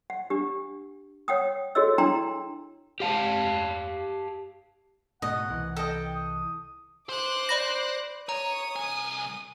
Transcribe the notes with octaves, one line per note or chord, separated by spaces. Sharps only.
F#5
D4 G4
C#5 F#5 G5 D#6
F#4 G#4 A4 C#5 D#5 E6
D4 E4 G5 A#5 C6
G4 F5 A5
G#2 B2 A3 D#5 F#5
C2 E3
A4 D#5 G5
D#6
C5 D6 F#6
D5 B5 A#6
C#5 A#5 D#6
C2 G#5